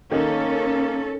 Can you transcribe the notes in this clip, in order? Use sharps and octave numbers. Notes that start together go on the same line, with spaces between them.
D#3 A#3 C#4 A4